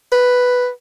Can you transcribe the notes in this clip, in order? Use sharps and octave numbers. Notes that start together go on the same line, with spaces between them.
B4